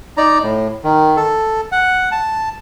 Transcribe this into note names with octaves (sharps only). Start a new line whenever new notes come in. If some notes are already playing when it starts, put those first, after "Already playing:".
D#4 D5 A#5
A2
D#3
A4
F#5
A5